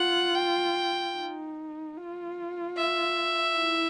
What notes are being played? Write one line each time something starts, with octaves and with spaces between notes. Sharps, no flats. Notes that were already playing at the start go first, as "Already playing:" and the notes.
Already playing: F4 F#5
G5
D#4
F4
E5
E4